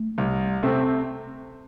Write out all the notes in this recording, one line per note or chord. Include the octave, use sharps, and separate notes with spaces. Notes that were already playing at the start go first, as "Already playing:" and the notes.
Already playing: A3
C2
C3 A3 C4